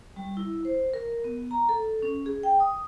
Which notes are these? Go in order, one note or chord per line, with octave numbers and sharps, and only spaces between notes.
G3
E4
C5
A#4
B3
A#5
A4
C#4
G#4
G5
D#6